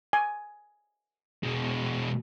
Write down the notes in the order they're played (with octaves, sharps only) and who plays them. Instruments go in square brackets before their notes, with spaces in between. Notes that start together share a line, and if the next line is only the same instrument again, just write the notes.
[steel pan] G#5
[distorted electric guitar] B2 G#3